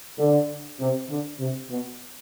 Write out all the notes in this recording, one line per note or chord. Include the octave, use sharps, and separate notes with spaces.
D3
C3
D3
C3
B2